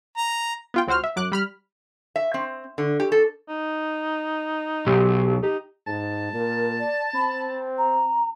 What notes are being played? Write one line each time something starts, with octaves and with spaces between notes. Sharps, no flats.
A#5
B3 F4 G5
C#2 C4 F#4 C5 F6
E5
F#2 D6 F#6
G3 B5 F6
E5
C4
D3
G4
A4
D#4
B1 G4
D#4 G4
G#2 A5
A#2 A#4
D5
C4 B5
A#5